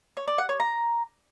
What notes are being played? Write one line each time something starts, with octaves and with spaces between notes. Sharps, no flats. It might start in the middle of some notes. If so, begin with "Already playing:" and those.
C#5
D5
F#5
C#5
A#5